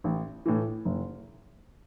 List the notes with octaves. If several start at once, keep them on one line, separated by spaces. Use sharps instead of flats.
A1
A2 E3
F#1